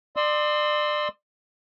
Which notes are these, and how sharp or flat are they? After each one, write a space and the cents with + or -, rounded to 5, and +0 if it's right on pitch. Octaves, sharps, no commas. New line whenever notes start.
D5 +30 C6 +0 E6 -25